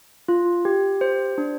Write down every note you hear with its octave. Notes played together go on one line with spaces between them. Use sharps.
F4
G4
C5
D4